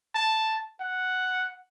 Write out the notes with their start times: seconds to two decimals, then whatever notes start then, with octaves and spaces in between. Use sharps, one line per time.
0.14 A5
0.80 F#5